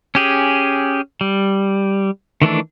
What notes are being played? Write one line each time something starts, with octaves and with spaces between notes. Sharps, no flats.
C#4 G4 G#4
G3
D#3 E3 A3 D4